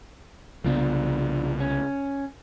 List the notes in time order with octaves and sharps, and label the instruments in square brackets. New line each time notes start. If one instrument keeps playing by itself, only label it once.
[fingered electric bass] C2 C#3 B3 [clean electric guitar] F3 D4
[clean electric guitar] C#4